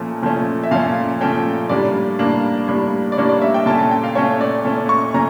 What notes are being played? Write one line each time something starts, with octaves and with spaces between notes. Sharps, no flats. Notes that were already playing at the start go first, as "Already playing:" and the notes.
Already playing: A#2 F3 A3 C#4
A#2 F3 A3 C#4
E5
A#2 F3 A3 C#4 F5
A#2 F3 A3 C#4 G5
A2 G3 A#3 D4 D5
A2 G3 A#3 D4
A2 G3 A#3 D4
D5
A2 G3 A#3 D4 C#5
D5
E5
G5
A#2 A3 C#4 A5
A5
G5
F5
A#2 A3 C#4 C#5
D5
A#2 A3 C#4
C#6
A#2 A3 C#4 A#5